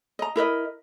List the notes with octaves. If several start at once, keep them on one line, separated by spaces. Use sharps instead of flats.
D#5 A#5
E4 A#4 B4 D#5